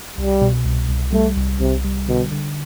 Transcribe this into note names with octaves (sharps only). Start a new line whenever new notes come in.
C2 G3
B2
C2
C2
G3 A3
C2
C2 C3
G3
B2 D3
D3